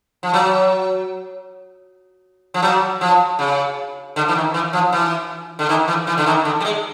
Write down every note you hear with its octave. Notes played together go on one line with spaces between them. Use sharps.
F3
F#3
F3
F#3
F3
C#3
D3
E3
D#3
E3
F3
E3
D3
D#3
E3
E3
D3
D#3
D3
G3
G#3